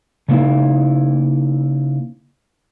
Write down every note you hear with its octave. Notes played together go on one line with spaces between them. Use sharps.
C#3 A3 A#3 D#4 E4